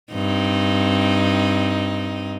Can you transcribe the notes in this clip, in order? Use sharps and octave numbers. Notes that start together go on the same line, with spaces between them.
G2 C4 D#4